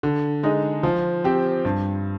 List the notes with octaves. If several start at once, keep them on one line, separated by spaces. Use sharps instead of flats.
D3
G#3 D#4
F3
C4 G4
G2